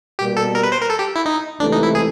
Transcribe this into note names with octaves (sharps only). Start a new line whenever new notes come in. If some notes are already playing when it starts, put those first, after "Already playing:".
B2 G3 A#3 G4
A4
A#4
B4
C5
A#4
A4
G4
E4
D#4
C#2 C3 E3 A3 D4
D#4
E4
G#4